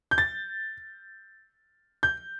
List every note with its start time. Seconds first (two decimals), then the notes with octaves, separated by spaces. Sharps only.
0.11 G6
0.18 A6
2.03 G6